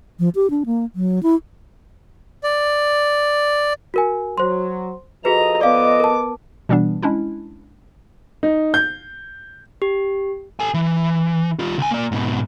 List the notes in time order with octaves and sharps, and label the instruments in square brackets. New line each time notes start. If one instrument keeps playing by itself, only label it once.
[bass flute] F3
G4
D4
A#3
F#3
E4
[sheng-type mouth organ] D5
[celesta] F#4 A#4 G#5
[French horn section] F#3 [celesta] C5 C6
[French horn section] F3 A4 D#5 [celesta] F#4 G#4 B4 [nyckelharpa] A#5
[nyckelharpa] B3 D6 [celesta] D5 F5
[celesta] A#4 A5
[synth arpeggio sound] B2 E3 G3 B3 D4
G#3 C#4 D4 E4
[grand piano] D#4
G6
[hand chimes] G4
[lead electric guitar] A4 G#5
E3
G3 F4
C#2 G#5
A#3 D5
G#2 B2